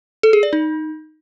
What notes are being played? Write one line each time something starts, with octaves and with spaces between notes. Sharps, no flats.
A4
G#4
D5
D#4